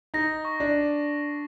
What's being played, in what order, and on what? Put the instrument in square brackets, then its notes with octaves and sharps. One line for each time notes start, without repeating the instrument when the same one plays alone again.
[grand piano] D#4 [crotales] A#6
[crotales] C#6
[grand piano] D4